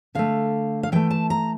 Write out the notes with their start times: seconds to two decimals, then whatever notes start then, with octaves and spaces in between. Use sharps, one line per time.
0.15 D3 A3 F5
0.83 F5
0.92 A2 E3 A3 G5
1.11 A5
1.30 A#5